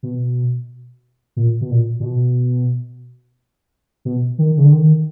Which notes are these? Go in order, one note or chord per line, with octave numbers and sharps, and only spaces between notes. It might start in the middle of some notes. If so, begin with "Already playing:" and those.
B2
A#2
B2
A#2
A#2
B2
B2
D#3
C#3
D3
D#3